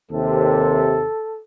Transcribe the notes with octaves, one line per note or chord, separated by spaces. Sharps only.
D#2 C3 A4